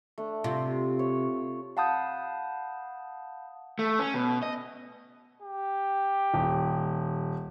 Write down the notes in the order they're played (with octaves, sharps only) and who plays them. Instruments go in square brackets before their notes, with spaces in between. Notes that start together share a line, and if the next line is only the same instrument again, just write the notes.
[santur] A3 D4
[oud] C3 [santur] F4
[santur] C#5
[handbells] F5 F#5 A5 B5 D#6 G6
[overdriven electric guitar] A3
C#4
B2
D#5
[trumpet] G4
[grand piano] D#1